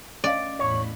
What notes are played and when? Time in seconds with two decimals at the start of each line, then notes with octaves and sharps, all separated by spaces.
0.24 C#4 D5 D#5 F5
0.59 E2 A2 C#5 B5